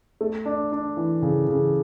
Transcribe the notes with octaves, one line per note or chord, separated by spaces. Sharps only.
A3
D4
D4
E3
C#3
C#3